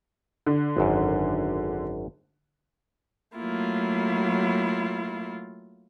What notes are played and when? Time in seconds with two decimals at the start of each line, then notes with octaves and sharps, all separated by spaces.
0.46 D3
0.77 G#1 F#2
3.37 F#3 A3 A#3 E4 F4